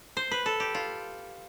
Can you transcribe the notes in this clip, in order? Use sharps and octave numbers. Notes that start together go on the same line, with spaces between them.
C5
B4
A4
G4
F4